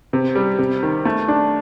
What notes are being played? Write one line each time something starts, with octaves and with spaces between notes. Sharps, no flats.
C3
G3
C3
D#3
A3
D4